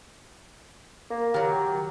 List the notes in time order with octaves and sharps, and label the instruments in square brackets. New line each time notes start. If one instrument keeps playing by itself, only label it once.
[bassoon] A#3
[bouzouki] D#3 F#3 [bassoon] G4